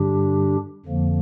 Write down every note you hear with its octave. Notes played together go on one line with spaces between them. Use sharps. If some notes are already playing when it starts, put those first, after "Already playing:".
Already playing: G2 D3 G3 D4 G4
F2 D3 F3 A#3